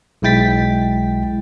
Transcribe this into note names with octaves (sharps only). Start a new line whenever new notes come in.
B1 G#3 E4 G5 A6 B6